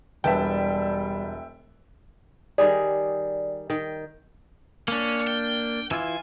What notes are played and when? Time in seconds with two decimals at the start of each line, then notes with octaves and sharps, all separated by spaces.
0.24 E1 G3 B4 E5 G5 A5
2.58 D#3 G3 G#4 D5
3.70 D#3 G5
4.88 A#3 C#4 D4
5.27 G5
5.91 E3 E4 F4 G#5